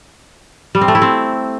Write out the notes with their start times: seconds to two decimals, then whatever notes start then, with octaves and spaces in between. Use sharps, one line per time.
0.75 G3
0.81 C4
0.88 A3
0.95 E4
1.02 C4